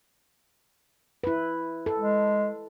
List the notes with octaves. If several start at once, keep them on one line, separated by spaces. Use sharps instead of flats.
E4 B4
A4
G#3